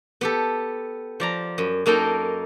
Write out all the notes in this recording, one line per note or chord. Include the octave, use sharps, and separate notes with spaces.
B3 G4 A4
F3 D5 A#5
F#2
F#2 A#3 D#4 A4 G5